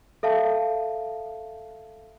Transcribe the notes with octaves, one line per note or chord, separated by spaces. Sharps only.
A4 E5 F5 A5